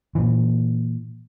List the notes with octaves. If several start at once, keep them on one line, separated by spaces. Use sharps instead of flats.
A#2 E3